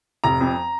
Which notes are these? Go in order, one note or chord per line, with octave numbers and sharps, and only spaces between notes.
F1 A#5
F2